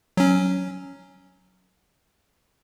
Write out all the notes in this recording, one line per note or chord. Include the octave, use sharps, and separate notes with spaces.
F#3 C#4